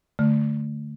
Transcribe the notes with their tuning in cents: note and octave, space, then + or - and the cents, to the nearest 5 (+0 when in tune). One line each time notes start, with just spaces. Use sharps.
D3 +0 A3 +0